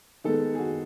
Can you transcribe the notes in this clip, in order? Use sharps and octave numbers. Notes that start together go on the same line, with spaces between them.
D#3 G#3 B3 A4
G#4
F#4